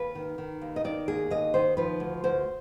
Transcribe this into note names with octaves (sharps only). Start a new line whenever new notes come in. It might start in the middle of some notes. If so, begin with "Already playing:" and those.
Already playing: D#2 B4
D#3
D#3
D#2
D#5
D#3 D5
D#2 G#4
D#2 D#5
D#3 C5
F3 B4
D2
D2 C5